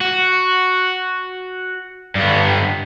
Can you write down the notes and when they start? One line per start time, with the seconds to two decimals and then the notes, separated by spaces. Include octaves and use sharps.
0.01 F#4
2.15 G2 B3